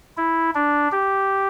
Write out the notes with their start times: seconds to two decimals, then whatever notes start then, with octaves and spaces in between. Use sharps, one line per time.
0.17 E4
0.55 D4
0.92 G4